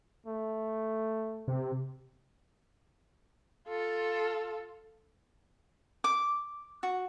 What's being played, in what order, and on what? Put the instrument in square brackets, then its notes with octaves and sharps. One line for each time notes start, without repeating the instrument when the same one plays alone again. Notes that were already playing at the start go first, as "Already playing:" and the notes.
[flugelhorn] A3
[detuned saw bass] C3
[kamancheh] F4 A4
[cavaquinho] D6
F#4